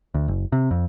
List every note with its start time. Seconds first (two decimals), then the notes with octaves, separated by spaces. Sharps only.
0.14 D2
0.28 F#1
0.52 C3
0.71 F2